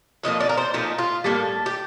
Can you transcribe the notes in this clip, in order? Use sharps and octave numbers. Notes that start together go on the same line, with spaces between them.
A2 F3 A#3 D#5
D5
A#4
C5
A#2 F3 A3 D#4
F4
A2 G3 A#3 A4
G4